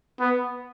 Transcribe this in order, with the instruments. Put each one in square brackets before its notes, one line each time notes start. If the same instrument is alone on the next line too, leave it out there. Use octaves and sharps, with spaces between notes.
[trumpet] B3